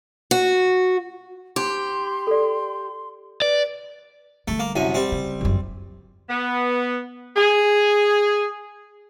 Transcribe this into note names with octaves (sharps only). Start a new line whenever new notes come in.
F#4
D#4 G4 C5 C6 D6
A4 D5
B4 D5
D3 G3 A3
A#3
C2 F#2 G#5
G3 C4
C#3
G1 F#2
B3
G#4